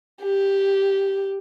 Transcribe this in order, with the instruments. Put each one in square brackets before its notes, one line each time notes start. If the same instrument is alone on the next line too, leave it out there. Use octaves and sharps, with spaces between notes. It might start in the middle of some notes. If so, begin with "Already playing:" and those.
[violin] G4